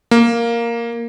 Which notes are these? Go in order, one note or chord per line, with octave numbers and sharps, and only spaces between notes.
A#3